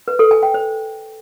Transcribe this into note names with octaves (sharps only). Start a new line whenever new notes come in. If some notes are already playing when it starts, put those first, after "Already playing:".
B4
A4
G#5
G5
C5